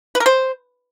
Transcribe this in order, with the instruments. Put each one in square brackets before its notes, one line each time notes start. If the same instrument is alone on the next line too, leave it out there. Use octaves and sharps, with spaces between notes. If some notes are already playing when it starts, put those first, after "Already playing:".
[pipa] B4
A#4
C5